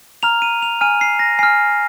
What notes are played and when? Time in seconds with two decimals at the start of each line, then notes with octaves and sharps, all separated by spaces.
0.23 A#5 F6 F7
0.42 D#7
0.62 F7
0.81 G#5 F6 D#7
1.01 C7
1.19 A#6
1.39 G#5 F6 C7